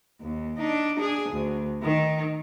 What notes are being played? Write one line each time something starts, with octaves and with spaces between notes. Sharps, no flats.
D#2
D4 D#4
D4 G#4
D2
D#3